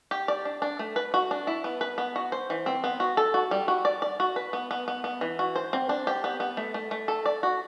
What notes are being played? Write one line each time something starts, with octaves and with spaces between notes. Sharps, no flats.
G4
D5
D4
D4
A3
B4
F#4
D4
E4
B3
B4
B3
F#4
C5
E3
C4
B3
F#4
A4
F#4
G3
F#4
D5
D5
F#4
B4
B3
B3
B3
B3
E3
F#4
C5
C4
D4
G4
B3
B3
A3
A3
A3
A4
D5
F#4